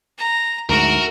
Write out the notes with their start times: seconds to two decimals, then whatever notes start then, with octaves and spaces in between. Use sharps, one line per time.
0.18 A#5
0.70 D2 G#2 F#4 A#4 E5